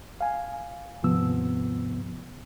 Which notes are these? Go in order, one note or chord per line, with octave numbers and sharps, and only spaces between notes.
F5 G#5
D#2 G#2 C3 F3 B3 E6